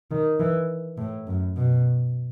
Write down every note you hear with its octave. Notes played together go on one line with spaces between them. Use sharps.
D#3
E3
A2
F#2
B2